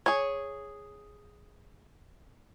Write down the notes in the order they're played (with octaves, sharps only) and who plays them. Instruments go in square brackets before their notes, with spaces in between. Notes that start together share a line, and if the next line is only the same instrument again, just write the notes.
[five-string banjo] G#4 C#5